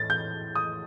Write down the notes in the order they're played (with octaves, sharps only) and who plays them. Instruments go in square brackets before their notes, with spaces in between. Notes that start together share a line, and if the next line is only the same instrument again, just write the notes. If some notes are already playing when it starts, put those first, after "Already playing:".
Already playing: [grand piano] A2 A6
G6
D#6